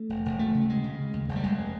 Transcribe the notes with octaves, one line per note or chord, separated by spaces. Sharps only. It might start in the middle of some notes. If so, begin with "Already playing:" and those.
Already playing: A3
E1
E1
D2 A3
C#3
D2 G#3
C#3
C#3
D#2
F1 G#3
G3
F1 G#3